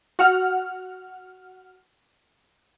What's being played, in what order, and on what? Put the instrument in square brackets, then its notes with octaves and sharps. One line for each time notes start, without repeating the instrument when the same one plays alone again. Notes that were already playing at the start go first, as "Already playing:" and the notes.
[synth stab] F#4 F#5 F6